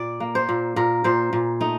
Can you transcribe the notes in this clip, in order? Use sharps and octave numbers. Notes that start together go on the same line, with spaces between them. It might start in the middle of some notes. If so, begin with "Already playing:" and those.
Already playing: A#2 D5
A#3
C5
A#2
A#2 A#4
A#2 C5
A#2
A3 D#4